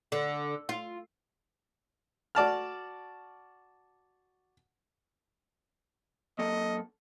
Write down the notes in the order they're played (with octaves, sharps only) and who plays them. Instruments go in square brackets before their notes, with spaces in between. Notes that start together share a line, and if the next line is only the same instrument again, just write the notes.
[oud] D3
F4
[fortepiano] F#4 D5 A5 F6
[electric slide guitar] F#2 A#3 A4 [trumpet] D#5